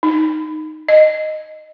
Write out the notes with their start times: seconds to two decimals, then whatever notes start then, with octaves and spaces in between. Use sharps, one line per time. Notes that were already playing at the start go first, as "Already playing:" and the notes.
0.03 D#4
0.89 D#5